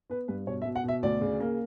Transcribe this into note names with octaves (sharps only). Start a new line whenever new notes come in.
B3 B4
G2 B4
B2 C#5
E5
B2
F#5
B2 E5
D2 D5
C#3
A#3